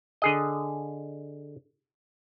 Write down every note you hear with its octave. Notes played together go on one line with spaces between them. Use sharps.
D3 G#4 D#5